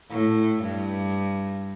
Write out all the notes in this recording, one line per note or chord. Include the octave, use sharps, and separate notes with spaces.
A2
G2